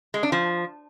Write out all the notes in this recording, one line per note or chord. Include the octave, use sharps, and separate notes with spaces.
G#3
D4
F3